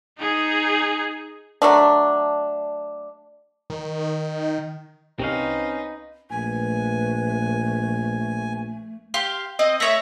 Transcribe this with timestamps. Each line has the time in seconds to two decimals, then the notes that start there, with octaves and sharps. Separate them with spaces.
0.18 D#4 G#4
1.62 F#3 A3 D4
3.70 D#3
5.19 C2 C4 C#4 D#4 B4 F5
6.31 A#1 A3 B4 G#5
9.14 G4 F5 C6
9.59 C4 D#5
9.80 A3 C#5 E5 A#6